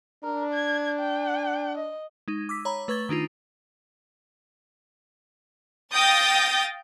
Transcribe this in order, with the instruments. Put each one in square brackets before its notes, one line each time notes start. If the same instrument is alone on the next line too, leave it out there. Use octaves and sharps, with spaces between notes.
[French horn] D4 [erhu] A#4
[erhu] G#6
G5
D#5
[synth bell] G#3 D#4
D6 E6 B6
C#5 A#5 B5
A3 B4 C#6 G#6 A6 G7
D#3 D4 D#4 F4
[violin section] F5 G5 D#6 G6 A6 A#6